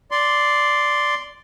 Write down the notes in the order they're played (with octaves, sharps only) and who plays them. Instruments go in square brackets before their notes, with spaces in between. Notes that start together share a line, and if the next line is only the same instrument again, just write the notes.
[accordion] D5 C6